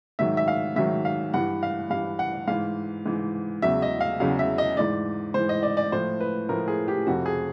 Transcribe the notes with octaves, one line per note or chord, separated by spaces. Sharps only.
G#2 D#3 F#3 E5
E5
F5
G#2 D#3 F#3 E5
F5
G2 E3 F#5
F5
G2 E3 F5
F#5
G#2 E3 F5
G#2 E3
E2 C#3 F#3 E5
D#5
F5
E2 C#3 F#3 F5
E5
D#5
G#2 E3 D5
G#2 E3 C5
D#5
D5
D5
A2 F3 C5
B4
A2 F3 A#4
G#4
G4
F2 C3 F3 F#4
G#4